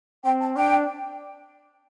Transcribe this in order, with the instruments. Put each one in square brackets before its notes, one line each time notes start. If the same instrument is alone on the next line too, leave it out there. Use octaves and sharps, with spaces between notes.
[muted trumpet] C4 [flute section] G5
[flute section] A5
[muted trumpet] D4 [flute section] G5